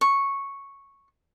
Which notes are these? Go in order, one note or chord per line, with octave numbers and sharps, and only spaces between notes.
C#6